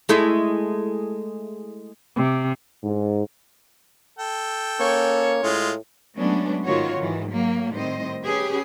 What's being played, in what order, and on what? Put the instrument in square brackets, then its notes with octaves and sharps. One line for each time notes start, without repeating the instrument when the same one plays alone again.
[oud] G#3 A3 E4
[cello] C3
[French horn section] G#2
[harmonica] A4 G5
[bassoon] A#3 [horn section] C#4 C#5
[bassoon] A2 [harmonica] G#3 F4
[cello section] F#3 G#3 A3 B3 C#4 D4
G#2 D#3 F4 F#4 C#5
G#2 D#3 E3
F#3 A#3
A2 D#3 G3 C4 C5 D#5
C#4 G4 G#4 B4